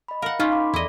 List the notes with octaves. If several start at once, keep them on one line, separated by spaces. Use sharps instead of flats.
D#5 B5
A#4 F5 F#5
A#3 C#4 D#4 F4 C6 B6
A#5 B5 D6
E2 E4 G#4 A4 D5 D#5